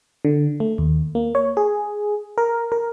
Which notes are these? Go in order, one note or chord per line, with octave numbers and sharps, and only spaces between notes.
D3
A3
D#2
A#3
C#5
G#4
A#4
A#4